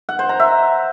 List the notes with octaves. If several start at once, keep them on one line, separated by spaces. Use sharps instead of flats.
F#5
C5
A#5
E5